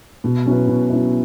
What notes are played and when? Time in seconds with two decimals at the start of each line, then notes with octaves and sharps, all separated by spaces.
0.24 B2
0.46 F#3 C#4 E4 B4
0.67 B2
0.90 F#3 C#4 E4 B4